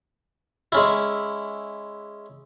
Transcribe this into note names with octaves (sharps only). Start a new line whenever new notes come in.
G#3 C#4 E4